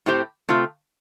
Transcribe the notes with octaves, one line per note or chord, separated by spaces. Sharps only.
A2 A3 C4 G4 C5
C3 A3 C4 F4